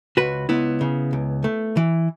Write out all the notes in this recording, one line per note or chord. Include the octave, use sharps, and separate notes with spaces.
C#2 F#4 B4
C#2 B3 E4
C#3
C#2
A3
E3